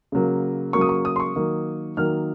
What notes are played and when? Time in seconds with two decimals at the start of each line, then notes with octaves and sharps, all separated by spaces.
0.12 C#3 F#3 A#3
0.73 C#3 F#3 A#3 C#6
0.81 D#6
0.89 C#6
1.05 D#6
1.16 C6
1.20 C#6
1.35 D#3 F#3 A#3
1.97 D#3 F#3 A#3 F6